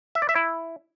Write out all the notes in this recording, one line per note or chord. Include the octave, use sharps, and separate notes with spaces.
E5
D5
E5
E4